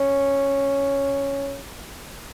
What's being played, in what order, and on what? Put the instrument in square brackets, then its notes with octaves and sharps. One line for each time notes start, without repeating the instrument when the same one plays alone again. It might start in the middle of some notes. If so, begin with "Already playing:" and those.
Already playing: [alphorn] C#4